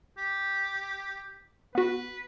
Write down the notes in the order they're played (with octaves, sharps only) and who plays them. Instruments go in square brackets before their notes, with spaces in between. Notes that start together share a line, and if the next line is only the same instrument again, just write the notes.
[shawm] G4
[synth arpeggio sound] B3 F#4 [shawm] B4